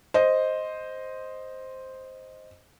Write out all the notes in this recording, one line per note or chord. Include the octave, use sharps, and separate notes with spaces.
C5 D#5